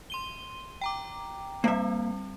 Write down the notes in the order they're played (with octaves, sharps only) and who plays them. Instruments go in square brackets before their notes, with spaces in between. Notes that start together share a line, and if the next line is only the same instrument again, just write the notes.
[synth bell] C6 D#7 G7
G5 A#5 D6
[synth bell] G3 C4 [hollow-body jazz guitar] A#3 E5